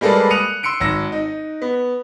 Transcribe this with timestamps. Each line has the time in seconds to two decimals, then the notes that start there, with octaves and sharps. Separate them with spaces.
0.01 G3 G#3 A#3 A4 B4 D5
0.30 D#6 F#6 C#7 D#7 F7
0.63 C6 E6 C#7 D7
0.80 G#1 E6 A#6
1.12 D#4
1.62 B3